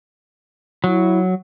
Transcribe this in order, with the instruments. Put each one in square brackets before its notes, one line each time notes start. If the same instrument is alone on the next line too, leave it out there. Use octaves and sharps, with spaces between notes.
[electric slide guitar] F#3 [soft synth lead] E4